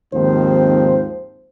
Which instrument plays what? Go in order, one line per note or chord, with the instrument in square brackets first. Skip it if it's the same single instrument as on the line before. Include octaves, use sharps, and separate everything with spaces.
[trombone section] D#2 G#2 F3 C4 C5